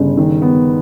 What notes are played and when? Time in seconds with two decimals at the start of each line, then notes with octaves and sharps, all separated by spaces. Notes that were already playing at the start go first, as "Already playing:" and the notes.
Already playing: G1 C#3
0.17 D#3
0.42 B3